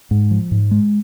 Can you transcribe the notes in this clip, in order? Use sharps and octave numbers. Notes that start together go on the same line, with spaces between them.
G#2
F3
G#2
G#3